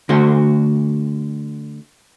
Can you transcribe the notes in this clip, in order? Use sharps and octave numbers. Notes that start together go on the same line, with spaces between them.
D3 A3 F#4 C5